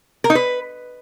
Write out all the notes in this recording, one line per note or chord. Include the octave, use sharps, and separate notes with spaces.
A#4
D#4
B4